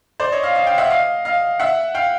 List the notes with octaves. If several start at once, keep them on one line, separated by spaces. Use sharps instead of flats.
C5 D5
C#5 D#5
D#5 F5
D#5 F5
F5 G5
E5 F#5
D#5 F5
D#5 F5
E5 F#5
F5 G5